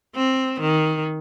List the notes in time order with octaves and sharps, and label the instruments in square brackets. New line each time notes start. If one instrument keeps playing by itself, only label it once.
[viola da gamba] C4
D#3